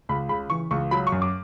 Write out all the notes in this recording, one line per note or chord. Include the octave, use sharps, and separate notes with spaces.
C#2 B5
C#3 B5
E3 C#6
C#2 C#6
F#3 B5
C#6
F#2
D6